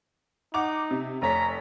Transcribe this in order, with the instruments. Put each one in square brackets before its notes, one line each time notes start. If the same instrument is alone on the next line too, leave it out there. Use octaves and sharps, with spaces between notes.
[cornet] D#4 [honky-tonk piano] F#5 D6 F7
[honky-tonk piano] C3
[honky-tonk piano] F1 C#5 B6 [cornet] A#5